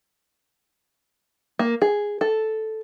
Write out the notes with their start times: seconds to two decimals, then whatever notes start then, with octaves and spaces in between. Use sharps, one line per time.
1.59 A#3
1.82 G#4
2.21 A4